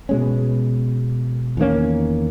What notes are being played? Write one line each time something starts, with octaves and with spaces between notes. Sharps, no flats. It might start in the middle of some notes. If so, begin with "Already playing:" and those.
B2 G#3 C#4
E2 D#3 A#3 C#4